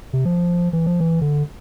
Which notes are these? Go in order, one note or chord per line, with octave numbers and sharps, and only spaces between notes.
C3
F3
E3
F3
E3
D3